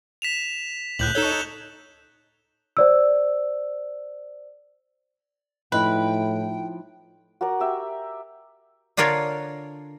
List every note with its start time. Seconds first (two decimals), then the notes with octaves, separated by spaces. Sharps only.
0.22 B6 E7 F7
0.99 C#2 A2 F#6 G6 F#7
1.15 D#4 A4 C#5 E7 G7
2.77 C5 D5 E6
5.72 A2 F3 D#4 E4 B4 G5
7.41 F#4 A#4 D5 A#5
7.60 G4 E5
8.97 D3 D4 F4 A#4 C#5 D5